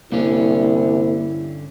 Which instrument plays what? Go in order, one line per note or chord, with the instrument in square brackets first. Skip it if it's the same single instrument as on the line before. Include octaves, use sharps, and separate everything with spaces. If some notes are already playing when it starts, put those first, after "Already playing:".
[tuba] C2 [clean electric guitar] G2 D3 C#4 [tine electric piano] A#3 [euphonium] E4